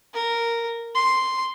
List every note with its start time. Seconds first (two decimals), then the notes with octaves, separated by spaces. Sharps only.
0.14 A#4
0.95 C6